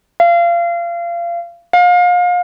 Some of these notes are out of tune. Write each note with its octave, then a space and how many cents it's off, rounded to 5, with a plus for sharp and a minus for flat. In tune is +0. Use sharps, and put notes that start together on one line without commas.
F5 -25
F5 +35